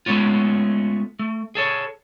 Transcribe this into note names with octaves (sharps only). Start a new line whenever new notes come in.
G#3 A3 B3 C#4 F4
A3
G#4 A4 C#5